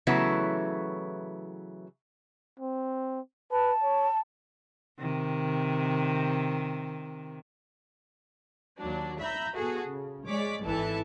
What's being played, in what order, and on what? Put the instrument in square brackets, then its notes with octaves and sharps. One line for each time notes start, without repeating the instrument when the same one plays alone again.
[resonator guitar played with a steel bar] C#3 E3 F#3 A3 B3 E4
[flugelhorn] C4
[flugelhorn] B4 [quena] A5
[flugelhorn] C#5
[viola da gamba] C3 D#3
[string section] D#2 F#3 D4
E5 A#5 B5 G6
B2 F#4 G#4 A4
C#3
G#3 C#5 D5 D6 B6
G#1 E3 A4 E5 A5